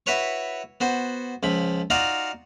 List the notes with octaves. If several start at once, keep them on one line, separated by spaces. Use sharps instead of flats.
E4 F#4 B4 C#5 C#6
B3 F#4 C5
C#2 F3 B5
D#4 F4 F#4 D5 F5 F#5